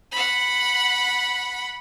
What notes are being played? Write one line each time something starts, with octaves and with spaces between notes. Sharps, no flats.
F#5 B5